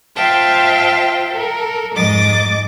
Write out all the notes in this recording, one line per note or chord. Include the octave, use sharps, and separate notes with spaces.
F4 C5 E5 F5 G5 A5
A4 A#4
F2 G#2 G#3 D#5 D6 A6